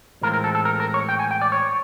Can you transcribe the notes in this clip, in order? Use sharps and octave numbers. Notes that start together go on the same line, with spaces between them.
A2 E3 G#3 C4 F4 A#4
A#4
A4
A4
A#4
A#4
C#5
G5
G#5
G5
D5
C#5